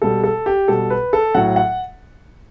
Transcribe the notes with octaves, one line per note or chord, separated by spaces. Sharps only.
B2 G3 A4
A4
G4
B2 G3 A4
B4
A4
A2 F#3 F#5
F#5